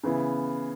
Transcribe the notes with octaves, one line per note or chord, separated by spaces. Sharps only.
C#3 E3 B3 E4